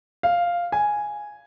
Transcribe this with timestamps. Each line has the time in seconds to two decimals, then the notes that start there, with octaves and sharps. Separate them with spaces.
0.23 F5
0.72 G#5